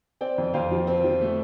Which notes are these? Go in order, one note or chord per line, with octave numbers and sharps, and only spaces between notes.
C4 D5 G5
F2
F2 C5 F5
F3
C4
F3
A3